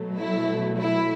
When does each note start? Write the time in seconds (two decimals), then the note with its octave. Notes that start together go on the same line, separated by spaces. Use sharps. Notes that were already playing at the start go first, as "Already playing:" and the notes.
Already playing: B2 F#3 A3
0.18 E4
0.80 E4